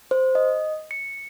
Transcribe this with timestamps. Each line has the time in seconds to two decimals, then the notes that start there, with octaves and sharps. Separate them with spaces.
0.11 C5
0.35 D#5
0.91 C#7